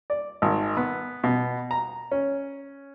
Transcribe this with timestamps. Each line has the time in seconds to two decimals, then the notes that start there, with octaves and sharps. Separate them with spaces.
0.10 D5
0.42 G#1
0.77 B3
1.24 B2
1.71 A#5
2.11 C#4